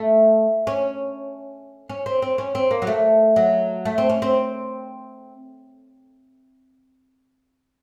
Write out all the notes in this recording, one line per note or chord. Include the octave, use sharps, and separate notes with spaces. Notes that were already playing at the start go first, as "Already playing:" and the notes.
Already playing: A3
C#4
C#4
C4
C4
C#4
C4
A#3
F#3
A3
F#3
A3
C4
C#4
C4